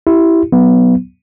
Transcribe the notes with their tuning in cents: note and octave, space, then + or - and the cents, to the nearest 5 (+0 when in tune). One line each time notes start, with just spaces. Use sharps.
E4 +0 G4 -15
F#3 +0 B3 +5